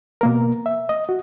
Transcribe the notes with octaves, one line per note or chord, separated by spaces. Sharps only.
B2 A#3 A#4
E5
D#5
F#4